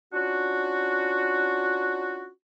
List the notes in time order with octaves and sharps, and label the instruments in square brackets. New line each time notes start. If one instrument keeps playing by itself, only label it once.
[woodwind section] C#4 D4 F4 F#4